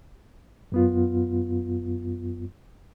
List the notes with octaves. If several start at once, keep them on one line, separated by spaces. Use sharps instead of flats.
F#2 B3 F4